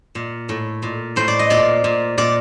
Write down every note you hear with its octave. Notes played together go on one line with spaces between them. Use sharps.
A#2
A2
A#2
A2 C5
D5
D#5
A#2 D5
A#2
A#2 D5